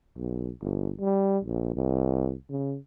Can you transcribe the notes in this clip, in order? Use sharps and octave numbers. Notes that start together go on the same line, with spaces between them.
B1
G1
G3
A#1
C2
C#3